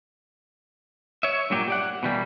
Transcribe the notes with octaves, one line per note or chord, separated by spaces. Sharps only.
C#5 E5
G2 A#2 F#3 G4
G4 D5 F#5
B2 E3 G3 A#3